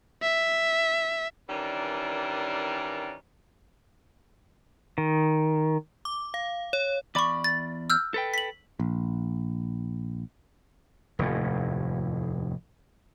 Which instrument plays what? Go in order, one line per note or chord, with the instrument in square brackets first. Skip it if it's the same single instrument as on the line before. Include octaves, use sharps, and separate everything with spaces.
[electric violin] E5
[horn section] D#3 E3 G3 C#4 D4 A#4
[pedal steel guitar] D#3
[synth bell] D6
F5
C#5
[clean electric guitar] E2 D5 B5 [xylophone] C#6 D6
[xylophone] A6
E6 F6 G6
[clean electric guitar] A4 B4 G5
[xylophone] B6 F#7
[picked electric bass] A#1
[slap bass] F1 D#2 A2